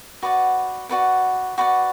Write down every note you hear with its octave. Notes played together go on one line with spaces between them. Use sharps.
F#4 B4 D5 F#5
F#4 B4 D5 F#5
F#4 B4 D5 F#5